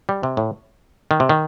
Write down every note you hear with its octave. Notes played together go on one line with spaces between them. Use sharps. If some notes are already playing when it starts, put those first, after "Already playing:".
G3
C3
A2
D#3
C3
D#3